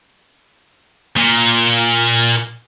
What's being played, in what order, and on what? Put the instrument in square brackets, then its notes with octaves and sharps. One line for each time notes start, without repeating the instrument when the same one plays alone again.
[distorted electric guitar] A#2